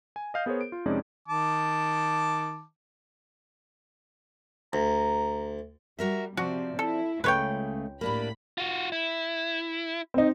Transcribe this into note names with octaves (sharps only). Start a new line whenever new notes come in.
G#5
D#5 F5 G6
B3 G#4 A#4 C5 C#5
D7
F4
F2 C3 G#3 C#4 D#4 D5
D#3 A5 D6
D2 A#5
G3 F#4 A#4 E5
C3 F3 C4 F#4 D5
E4 A4
C#2 C#3 A3 B4 C#5 G5
A2 A#3 D4 G4 B5
F4 F#4
E4
C4 D#4